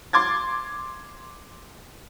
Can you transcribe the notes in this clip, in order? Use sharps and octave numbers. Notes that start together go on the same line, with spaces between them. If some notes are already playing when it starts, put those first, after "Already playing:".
C6 D6 G#6 A6